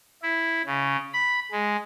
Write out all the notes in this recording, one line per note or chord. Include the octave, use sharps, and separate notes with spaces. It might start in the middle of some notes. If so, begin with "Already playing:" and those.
E4
C#3
B5
G#3